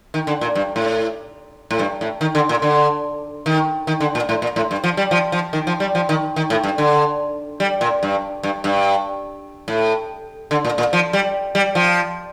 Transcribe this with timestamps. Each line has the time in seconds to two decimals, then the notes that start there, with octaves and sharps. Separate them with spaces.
0.14 D#3
0.27 D3
0.41 A#2
0.55 G2
0.76 A2
1.71 A2
1.79 G2
2.01 A2
2.21 D#3
2.35 D3
2.49 A#2
2.62 D3
3.46 D#3
3.87 D#3
4.00 D3
4.15 A#2
4.29 A2
4.42 A#2
4.56 A2
4.71 G2
4.84 F3
4.97 G3
5.11 F3
5.32 F3
5.53 D#3
5.67 F3
5.80 G3
5.95 F3
6.09 D#3
6.36 D#3
6.50 A2
6.64 G2
6.78 D3
7.60 G3
7.81 A#2
8.03 G2
8.43 G2
8.64 G2
9.68 A2
10.51 D3
10.65 A#2
10.78 A#2
10.93 F3
11.13 G3
11.55 G3
11.75 F3